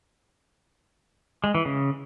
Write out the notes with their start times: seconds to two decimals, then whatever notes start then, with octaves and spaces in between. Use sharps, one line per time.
1.44 G#3
1.55 E3
1.65 C#3